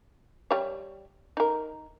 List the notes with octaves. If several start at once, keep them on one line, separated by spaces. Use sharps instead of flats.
G3 C#5
D#4 A#4